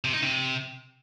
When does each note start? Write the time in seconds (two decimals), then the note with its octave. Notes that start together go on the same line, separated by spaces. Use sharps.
0.04 C3
0.13 D#4
0.22 C3